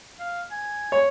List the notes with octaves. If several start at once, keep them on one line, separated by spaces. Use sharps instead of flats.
F5
G#5
C#5